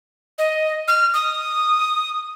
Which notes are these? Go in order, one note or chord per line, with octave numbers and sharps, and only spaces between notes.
D#5
F6
D#6